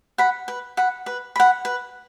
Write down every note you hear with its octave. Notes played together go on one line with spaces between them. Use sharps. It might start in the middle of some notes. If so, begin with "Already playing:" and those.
F#5 B5
B4
F#5 B5
B4
F#5 B5
B4